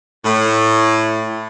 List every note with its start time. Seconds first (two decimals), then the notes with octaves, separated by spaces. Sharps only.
0.24 A2